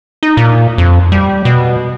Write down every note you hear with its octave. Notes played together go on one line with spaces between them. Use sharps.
D#4
A#2
F2
G3
B2